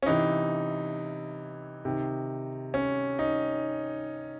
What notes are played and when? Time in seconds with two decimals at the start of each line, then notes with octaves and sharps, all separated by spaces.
0.02 C#4
0.06 C3 E3 D#4
1.85 C3 D#3
2.74 C#4
3.19 D#4